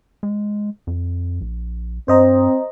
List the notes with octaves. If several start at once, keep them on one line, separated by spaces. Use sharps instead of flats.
G#3
F2
A#1
G2 C4 C5 D#5 A#5